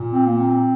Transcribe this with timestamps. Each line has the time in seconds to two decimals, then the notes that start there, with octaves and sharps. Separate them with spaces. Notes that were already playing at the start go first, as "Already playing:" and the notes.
Already playing: A#2
0.12 C4
0.26 A#3
0.37 C4